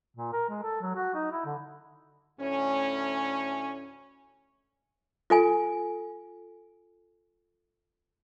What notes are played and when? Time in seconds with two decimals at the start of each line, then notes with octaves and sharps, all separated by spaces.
0.17 A#2
0.33 A#4
0.49 G#3
0.63 A4
0.81 F#3
0.96 F#4
1.15 D#4
1.32 E4
1.45 D3
2.40 D2 A2 C#4
5.30 F4 A4 G#5